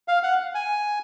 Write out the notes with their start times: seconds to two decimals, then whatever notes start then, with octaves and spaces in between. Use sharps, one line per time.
0.08 F5
0.23 F#5
0.55 G#5